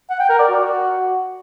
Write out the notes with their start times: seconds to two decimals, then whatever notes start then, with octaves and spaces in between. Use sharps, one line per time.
0.09 F#5
0.19 G5
0.29 A#4
0.39 D5
0.49 F#4